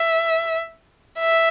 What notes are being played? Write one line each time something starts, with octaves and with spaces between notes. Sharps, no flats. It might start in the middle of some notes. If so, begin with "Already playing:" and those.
Already playing: E5
E5